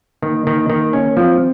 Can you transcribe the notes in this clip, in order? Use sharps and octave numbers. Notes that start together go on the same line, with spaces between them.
D#3 A#3
D#3
D#3
C#4
F3 C4